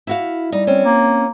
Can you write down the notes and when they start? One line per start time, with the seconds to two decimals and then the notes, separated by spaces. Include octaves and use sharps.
0.07 E4 F#4 F5
0.52 G3 D#4
0.67 C4 C#4
0.85 A#3